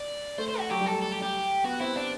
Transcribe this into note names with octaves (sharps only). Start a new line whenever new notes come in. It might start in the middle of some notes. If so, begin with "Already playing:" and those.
Already playing: D5
A3 C5
C5
F#4
F#3 G4
G3
A4
A3
A4
G4
G4
B3 F#4
C4 E4
D4